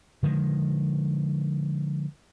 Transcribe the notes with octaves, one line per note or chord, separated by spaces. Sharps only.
D3 D#3 F3 G#3